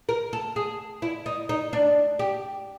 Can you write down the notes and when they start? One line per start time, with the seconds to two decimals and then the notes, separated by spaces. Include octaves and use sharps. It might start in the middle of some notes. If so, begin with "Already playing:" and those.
0.09 A#4
0.33 A4
0.56 G#4
1.02 E4
1.26 D#4
1.49 D#4
1.73 D4
2.19 G4